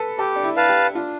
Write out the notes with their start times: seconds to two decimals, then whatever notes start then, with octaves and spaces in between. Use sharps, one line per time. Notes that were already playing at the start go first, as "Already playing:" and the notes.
Already playing: A4 B4
0.19 G4 A4
0.36 D4
0.43 E4
0.57 B4 F5 A5
0.69 G4
0.95 D4 F4